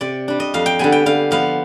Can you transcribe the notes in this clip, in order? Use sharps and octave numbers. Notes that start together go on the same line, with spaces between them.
C3 D5
G3 D4
D#5
F2 F5
G5
D3 G3 B3 G#5
G5
D3 F5
F3 B3 F5